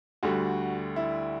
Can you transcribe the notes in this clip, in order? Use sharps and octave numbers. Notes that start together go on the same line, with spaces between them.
D2 D3 G3 F#4
E4